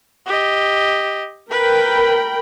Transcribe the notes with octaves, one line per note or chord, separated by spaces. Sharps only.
G4 D#5
A#4 B4 G5 B5